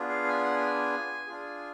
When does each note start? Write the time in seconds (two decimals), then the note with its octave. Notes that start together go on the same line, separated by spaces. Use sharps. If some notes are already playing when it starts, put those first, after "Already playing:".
Already playing: B3 D4 F4 G#4
0.09 F5
0.29 G#5
0.42 F#5
0.55 G#5
1.27 D4 F4 G#4